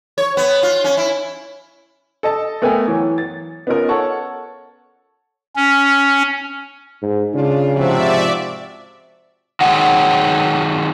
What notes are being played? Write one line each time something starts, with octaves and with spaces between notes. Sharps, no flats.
C#5
B3
F4
C#4
E4
A4 D#5 A5
A3 B3 A4 A#4 G5 G#5
E3 F#3
A6
B3 C#4 D#4 F4 A#4
A4 C#5 F#5 A5 C#6
C#4
G#2
C#3 D4 F4
G#2 C3 F3 F#4 D5 E5
D#3 F#3 G#3 F#5